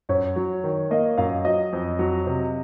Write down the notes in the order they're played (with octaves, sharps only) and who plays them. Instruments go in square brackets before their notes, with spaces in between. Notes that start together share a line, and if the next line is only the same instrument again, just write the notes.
[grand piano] F#2 [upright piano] C#5
[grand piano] F#3
D#3
[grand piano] A#3 [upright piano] D#5
[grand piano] F#2 [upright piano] F5
[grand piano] F#3 [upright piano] D#5
[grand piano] F2
F#3
C3